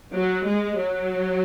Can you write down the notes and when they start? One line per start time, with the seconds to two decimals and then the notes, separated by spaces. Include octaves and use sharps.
0.14 F#3
0.47 G#3
0.80 F#3